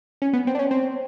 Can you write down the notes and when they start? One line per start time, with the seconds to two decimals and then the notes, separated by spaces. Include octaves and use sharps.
0.22 C#4
0.33 B3
0.47 C4
0.55 D4
0.59 C#4
0.71 C4